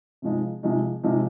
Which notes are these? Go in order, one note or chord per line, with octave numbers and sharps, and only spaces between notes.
C3 F3 G#3 D#4
C3 F3 G#3 D#4
C3 F3 G#3 D#4